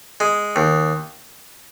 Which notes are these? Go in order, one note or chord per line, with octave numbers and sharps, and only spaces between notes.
G#3
D#2